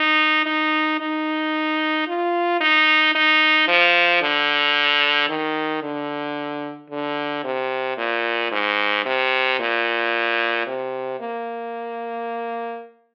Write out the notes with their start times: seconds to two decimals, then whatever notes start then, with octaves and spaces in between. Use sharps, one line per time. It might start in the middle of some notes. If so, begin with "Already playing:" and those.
Already playing: D#4
0.46 D#4
1.00 D#4
2.07 F4
2.61 D#4
3.15 D#4
3.68 F3
4.22 D3
5.29 D#3
5.83 D3
6.90 D3
7.44 C3
7.98 A#2
8.52 G#2
9.06 C3
9.59 A#2
10.67 C3
11.20 A#3